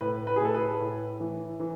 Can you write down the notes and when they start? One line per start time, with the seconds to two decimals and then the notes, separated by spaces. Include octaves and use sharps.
0.01 A2 B4
0.27 B4
0.36 G#4
0.41 A2 A4
0.54 B4
0.80 A2
1.20 E3
1.60 E3